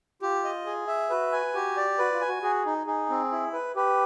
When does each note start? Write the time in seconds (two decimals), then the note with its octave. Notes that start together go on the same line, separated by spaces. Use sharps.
0.22 F4 G4
0.44 D#5
0.66 G#4
0.87 E5
1.10 F#4 B4
1.32 G#5
1.54 F#4 G4
1.77 D5
1.98 F#4 B4
2.13 F4
2.21 G#5
2.28 F#4
2.42 F#4 G#4
2.66 D#4
2.87 D#4 G#4
3.10 C4
3.32 E4
3.53 B4
3.76 G4 B4